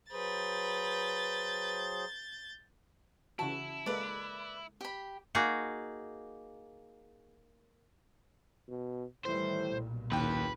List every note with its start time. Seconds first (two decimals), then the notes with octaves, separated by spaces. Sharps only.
0.12 F#3 G#4 B4 C5 G6 A6
3.39 C#3 E3 E4 F#4 A5
3.86 G#3 A#3 A4 B4 D5
4.81 G4 B5
5.35 A#3 D#4 F#4 G#4
8.69 B2
9.25 A2 D#3 E3 G3 C5
9.70 B1 A#2
10.12 F#1 D#2 B4 G5